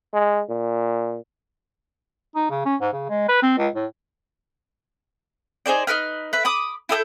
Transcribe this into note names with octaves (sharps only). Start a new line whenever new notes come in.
G#3
A#2
D#4
C#3
C#4
G#2
C#3
G#3
B4
C4
C#2
A2
D#4 G#4 C5 D5
D#4 A#4 B4 F6
B4 E5
B5 D6 D#6
E4 A4 D#6 G6